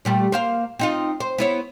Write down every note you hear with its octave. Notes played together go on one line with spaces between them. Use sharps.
A#2 G3 A3
A#3 C5 F5
C4 D#4 F4
C5
B3 E4 C#5